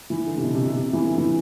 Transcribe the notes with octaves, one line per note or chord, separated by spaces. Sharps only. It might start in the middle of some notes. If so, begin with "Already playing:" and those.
E3
D3
C3
B2
C3
B2
C3
E3
D3
E3